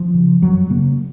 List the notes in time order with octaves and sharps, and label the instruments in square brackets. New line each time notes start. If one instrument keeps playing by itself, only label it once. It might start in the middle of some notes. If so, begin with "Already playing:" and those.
Already playing: [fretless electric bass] F3
C#3
F#2 F#3
C#3 A#3